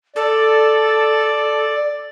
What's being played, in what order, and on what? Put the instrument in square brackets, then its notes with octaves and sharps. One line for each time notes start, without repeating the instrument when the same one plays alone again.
[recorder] A4 [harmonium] D5